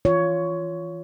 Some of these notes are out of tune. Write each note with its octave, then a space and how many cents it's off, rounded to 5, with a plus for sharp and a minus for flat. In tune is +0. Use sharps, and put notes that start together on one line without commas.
E3 +0 F4 +0 C#5 +15